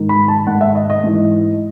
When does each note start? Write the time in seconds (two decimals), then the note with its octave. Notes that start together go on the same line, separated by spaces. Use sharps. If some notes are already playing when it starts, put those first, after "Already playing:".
Already playing: G#2 D#3
0.09 B5
0.28 A5
0.47 G#2 D#3 F#5
0.61 E5
0.75 D#5
0.90 D#5
1.04 G#2 E3